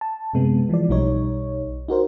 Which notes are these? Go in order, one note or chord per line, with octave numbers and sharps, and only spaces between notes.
A5
F#2 C3 G#3 B3
E3 F3 G#3 D5
B1 G3 D#4 C#5
D#4 F#4 A#4 C5